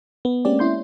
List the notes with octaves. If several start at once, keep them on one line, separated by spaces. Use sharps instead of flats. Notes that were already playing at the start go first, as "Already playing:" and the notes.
B3
G#3 A#3 C4 C#4 G4 D5
C#4 E4 C6 G6